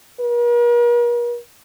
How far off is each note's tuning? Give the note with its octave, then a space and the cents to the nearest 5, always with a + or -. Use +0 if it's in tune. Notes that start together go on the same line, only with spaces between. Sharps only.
A#4 +45